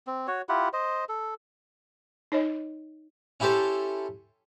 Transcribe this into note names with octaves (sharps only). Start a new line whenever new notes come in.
C4
F#4 C#5
E4 F4 G4 F#5
C5 D#5
A4
D#4 C#5 D#5
C#4 E4 G4 A4 C5